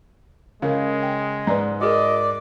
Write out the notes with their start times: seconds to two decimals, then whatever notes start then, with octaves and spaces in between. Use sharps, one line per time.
0.62 C#3 G#3 A#4 F5
1.03 G5
1.47 G#2 B4 D5 A#5
1.81 F#4 G#4 A#4 D5 D#5